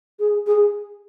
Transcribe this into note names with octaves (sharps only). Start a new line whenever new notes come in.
G#4
G#4